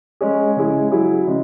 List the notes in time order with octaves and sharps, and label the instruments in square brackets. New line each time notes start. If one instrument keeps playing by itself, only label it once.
[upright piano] G#3 C#4 G#4
C#3 G#3 E4 G#4
F#3 E4 G#4
C#3 G#3